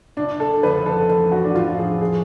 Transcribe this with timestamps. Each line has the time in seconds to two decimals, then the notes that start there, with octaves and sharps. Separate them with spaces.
0.17 F#1 D4
0.40 A4
0.63 F2 D3 F3 A3 B4
0.86 A4
1.09 A1 A4
1.32 F#4
1.45 D4
1.55 A2 F3 F4
1.78 G#4
2.01 G#4